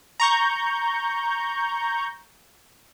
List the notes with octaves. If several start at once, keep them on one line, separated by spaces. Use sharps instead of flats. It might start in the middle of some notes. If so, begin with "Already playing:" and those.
A#5 C#6 G6